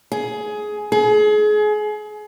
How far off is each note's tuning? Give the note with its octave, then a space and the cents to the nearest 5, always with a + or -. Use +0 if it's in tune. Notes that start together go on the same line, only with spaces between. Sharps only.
G#4 +15
G#4 +30